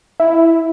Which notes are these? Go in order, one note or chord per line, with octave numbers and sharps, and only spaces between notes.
E4